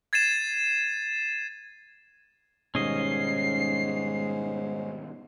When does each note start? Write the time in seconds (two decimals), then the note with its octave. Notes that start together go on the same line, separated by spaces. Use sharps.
0.13 G#6 A6 C7 D#7 E7
2.75 G#2 B2 D#3 G3 C#4 D#5 C7